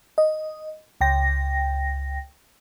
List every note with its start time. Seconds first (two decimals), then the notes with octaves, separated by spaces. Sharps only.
0.18 D#5
1.01 C#2 G5 A#6